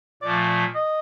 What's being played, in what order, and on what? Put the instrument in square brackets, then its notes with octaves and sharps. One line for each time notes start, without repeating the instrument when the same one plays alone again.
[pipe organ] A#2 F3 A3 [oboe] D5
[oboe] D#5